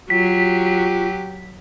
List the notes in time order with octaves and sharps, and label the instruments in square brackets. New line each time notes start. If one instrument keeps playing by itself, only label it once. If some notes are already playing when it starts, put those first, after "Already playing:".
[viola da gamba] F#3 [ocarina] F4 [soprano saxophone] G4 [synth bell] B6